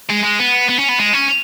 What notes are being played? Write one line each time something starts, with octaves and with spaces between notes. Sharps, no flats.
G#3
G#3
B3
B3
C#4
B3
G#3
C#4